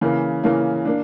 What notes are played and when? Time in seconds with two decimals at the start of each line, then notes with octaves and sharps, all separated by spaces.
0.01 C#3 E3 A#3
0.44 C#3 E3 A#3
0.85 A#3 D4